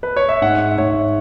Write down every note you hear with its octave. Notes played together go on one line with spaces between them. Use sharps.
B4
C#5
E5
G#2 F#5
E5
G#2 C#5